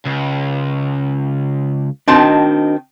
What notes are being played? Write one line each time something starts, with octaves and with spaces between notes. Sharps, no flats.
C#2
D#3 C4 D4 F#4 D#5 A5